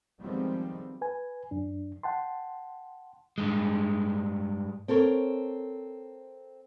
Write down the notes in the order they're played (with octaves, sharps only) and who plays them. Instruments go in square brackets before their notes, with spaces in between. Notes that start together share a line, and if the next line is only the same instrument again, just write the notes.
[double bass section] D#3 F3 G3 G#3 B3 C4
[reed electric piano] B4 G#5
F#2 D4
F#5 G5 A5 C6
[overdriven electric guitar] G2 G#3
[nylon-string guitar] C4 A4 A#4 C#5